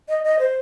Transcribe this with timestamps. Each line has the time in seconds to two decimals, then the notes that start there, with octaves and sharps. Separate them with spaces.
0.09 D#5
0.24 D#5
0.39 C5